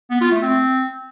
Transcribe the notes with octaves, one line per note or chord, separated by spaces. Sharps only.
B3
F4
A3
C4